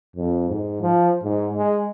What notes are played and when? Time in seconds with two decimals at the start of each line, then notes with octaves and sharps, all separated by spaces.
0.16 F2
0.49 G#2
0.82 F3
1.23 G#2
1.54 G#3